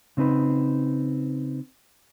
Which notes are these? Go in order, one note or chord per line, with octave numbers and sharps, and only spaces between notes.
C#3 C4 D#4 B4